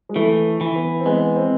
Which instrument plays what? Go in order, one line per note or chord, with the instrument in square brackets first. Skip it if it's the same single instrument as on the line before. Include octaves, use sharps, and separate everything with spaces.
[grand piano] G#3
[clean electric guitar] E3 [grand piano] A3
[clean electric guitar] E3
[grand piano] B3
C4
[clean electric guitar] G#3 [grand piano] B3
[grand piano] C4